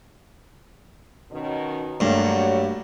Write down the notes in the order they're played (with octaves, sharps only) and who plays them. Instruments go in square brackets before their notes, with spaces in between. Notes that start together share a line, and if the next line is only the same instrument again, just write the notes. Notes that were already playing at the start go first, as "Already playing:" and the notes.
[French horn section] B2 D#3 C#4
[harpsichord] G2 [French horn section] F#3 [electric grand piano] G3 A3 A#3